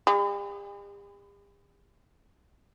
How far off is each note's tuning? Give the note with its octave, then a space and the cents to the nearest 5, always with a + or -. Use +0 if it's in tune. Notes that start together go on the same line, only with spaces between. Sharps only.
G3 +45